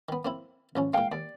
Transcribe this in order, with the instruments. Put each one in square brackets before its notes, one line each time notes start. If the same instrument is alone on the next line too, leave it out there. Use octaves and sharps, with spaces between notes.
[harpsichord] D#3 B3
A#3 C4 E4
A1 F3 C#4
[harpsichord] A#2 G#3 [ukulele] F5 G5
[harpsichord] D#2 [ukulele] D5